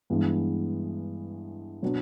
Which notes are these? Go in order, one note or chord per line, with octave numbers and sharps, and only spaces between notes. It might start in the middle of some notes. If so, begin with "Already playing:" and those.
G2 E3 G#3 B3
B2 F#3 B3 D4